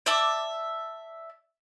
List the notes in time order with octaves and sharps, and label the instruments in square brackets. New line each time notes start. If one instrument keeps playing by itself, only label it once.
[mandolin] D5 E5 A5 D6